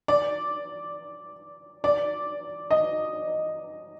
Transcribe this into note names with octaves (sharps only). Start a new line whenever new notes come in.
D5
D5
D#5